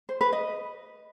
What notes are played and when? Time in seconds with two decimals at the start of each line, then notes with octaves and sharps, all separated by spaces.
0.09 C5
0.21 B4
0.33 D#5